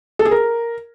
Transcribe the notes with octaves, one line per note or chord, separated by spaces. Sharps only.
A4
G#4
A#4